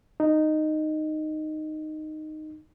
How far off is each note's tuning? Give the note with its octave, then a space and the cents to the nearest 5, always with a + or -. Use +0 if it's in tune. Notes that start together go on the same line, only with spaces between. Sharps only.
D#4 -10